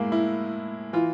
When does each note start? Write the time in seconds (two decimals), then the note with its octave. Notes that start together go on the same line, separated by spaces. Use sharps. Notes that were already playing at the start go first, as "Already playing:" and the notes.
Already playing: A2 G#3 A#3
0.12 E4
0.93 E3 F4